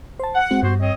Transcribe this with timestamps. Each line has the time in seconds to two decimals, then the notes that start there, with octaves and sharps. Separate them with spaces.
0.20 C5 A5
0.35 F#5
0.51 G#3 C4 F#4
0.63 G2 B3 F#4 C5
0.80 C4 C#5 D#5